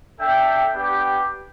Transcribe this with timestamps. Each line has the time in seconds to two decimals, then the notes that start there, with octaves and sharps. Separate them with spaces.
0.19 D4 A4 E5 G5
0.74 B3 D4 G4